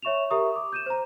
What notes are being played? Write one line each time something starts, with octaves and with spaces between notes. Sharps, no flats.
C#5 E5 C#6 E7 F7
G4 A#4 E5 A#5 C#6 D#6
D6
G6 D#7 E7
C5 A#5